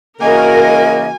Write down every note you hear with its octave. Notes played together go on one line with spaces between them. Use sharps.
C#3 E3 A#3 F#4 A#4 D#5 G#5